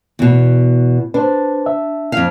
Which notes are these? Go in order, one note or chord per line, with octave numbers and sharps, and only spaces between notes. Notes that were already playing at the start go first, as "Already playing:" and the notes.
E2 B2
D4 B4 C5
E5
F2 F5